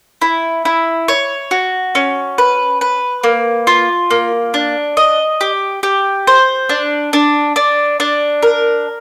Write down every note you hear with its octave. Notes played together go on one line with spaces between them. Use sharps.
E4
E4
C#5
F#4
C#4
B4
B4
A#3
F4
A#3
D4
D#5
G4
G4
C5
D4
D4
D4
D4
A#4